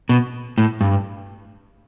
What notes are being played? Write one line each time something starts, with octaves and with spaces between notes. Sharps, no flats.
B2
A2
G2